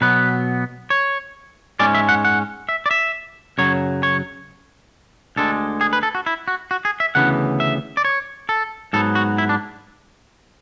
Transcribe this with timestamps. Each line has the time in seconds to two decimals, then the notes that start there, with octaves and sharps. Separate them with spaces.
0.01 B2 F#3 B3 B4
0.90 C#5
1.80 G#2 G#3 C#4 D5
1.95 E5
2.09 F#5
2.25 F#5
2.69 E5
2.86 D5
2.91 E5
3.58 F#2 C#3 F#3 C#5
4.03 C#5
5.36 D2 D3 G#3 A4
5.81 G#4
5.93 B4
6.03 A4
6.15 F#4
6.26 E4
6.48 F#4
6.71 F#4
6.85 G#4
7.00 E5
7.15 D2 C#3 E3 B3 F#5
7.60 E5
7.97 D5
8.05 C#5
8.49 A4
8.93 G#2 F#3 B3 A4
9.15 F#4
9.38 E4
9.49 D4